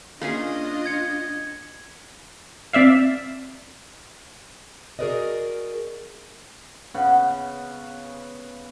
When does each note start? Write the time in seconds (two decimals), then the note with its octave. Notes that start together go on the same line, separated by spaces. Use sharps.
0.21 A#3 C#4 D4 F4 G#4 D#5
0.86 G#6 C#7
2.73 C4 D5 E5 F5
4.99 F#4 G#4 A#4 B4 D5 D#5
6.94 C#3 B3 B4 F#5